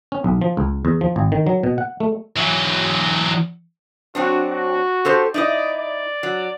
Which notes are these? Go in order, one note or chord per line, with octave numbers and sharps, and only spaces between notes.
C#4
B1
F3
C#2
E2
F3
G#1
D#3
F#3
B2
F#5
A3
E3 F#3
F#3 C4 D4 F#4
F#4
G4 A4 C5
D#4 E4 D5 D#5
D5
F#3